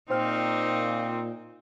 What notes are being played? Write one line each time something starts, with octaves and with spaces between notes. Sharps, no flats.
A#2 A#3 C4 D#4 C5 G5 F6